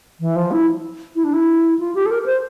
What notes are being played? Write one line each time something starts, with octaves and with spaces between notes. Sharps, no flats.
E3
F3
E4
E4
D4
E4
F4
G4
A4
A#4
A#4
C5